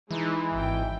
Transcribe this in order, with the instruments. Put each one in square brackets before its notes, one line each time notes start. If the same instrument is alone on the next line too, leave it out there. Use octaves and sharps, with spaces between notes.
[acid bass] E3 [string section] G#3 D#4
[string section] G#1 G5